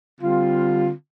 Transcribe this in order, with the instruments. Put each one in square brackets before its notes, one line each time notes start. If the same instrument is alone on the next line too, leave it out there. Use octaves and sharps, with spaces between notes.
[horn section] D3 G3 C4 F4